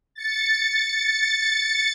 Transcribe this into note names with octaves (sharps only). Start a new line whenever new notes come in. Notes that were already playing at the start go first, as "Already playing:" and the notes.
A6 C#7